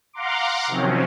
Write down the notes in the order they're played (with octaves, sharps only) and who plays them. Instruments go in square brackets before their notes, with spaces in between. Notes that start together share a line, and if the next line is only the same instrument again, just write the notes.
[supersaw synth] F5 F#5 A#5 C6 D6
C3 D#3 F3 F#3 C4 C#4